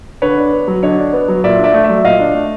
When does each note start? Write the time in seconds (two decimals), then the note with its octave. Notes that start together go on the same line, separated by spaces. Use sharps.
0.22 D3 B4 C#5
0.37 D4
0.53 B3
0.68 F#3
0.83 D3 C#5 D#5
0.98 D4
1.13 B3
1.28 F#3
1.44 A#2 D5 E5
1.58 D4
1.64 D5 E5
1.74 A3
1.84 D5 E5
1.89 F#3
2.04 A#2 D#5 F5
2.20 D4
2.35 A3